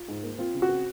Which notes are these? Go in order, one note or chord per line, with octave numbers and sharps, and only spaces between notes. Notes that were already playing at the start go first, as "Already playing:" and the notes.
Already playing: F4
G#2
A#3
C4 F4
C#3
F#4
C4